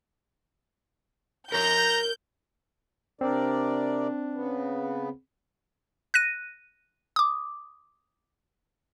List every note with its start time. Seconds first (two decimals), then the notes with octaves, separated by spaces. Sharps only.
1.52 A#4 C#5 A#5 G6
3.21 C3 C4 D4 A#4 D5
4.33 C#3 B3
6.14 F#6 A#6 D#7
7.16 D6 D#6